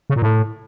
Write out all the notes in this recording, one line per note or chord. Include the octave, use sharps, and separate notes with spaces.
C#3
A#2
A2